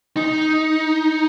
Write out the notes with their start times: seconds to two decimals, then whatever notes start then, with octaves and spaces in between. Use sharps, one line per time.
0.17 D#4